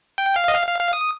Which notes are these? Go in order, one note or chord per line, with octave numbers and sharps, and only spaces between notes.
G5
F5
D#5
F5
F5
F5
D#6